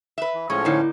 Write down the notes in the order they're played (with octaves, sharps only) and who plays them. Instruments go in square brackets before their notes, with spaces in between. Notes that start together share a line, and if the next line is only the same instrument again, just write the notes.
[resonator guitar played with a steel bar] B4 E5
[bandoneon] E3
[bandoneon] A2 F3 C#4 [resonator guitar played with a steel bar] G#3 [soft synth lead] A4 [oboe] C#5
[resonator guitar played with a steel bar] D3 A#3 D#4 [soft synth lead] E4